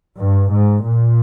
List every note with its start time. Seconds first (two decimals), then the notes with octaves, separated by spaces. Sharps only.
0.19 G2
0.52 G#2
0.85 A#2